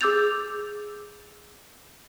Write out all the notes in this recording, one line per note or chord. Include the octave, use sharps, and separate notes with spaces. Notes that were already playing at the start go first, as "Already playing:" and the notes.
G#4 D6 E6 G6 A6 F7